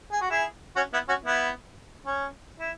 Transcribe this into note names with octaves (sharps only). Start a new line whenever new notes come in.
G#4
F#4
E4 G#4
C#4 F#4
B3 E4
C#4 F#4
B3 E4
C#4
E4